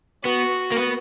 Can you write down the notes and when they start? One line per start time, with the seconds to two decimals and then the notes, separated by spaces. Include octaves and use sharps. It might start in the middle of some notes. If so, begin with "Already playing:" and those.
0.25 B3 F#4
0.72 A#3
0.77 B3